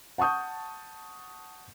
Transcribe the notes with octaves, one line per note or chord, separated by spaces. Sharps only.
F#5 A5 C#6 D#6 G6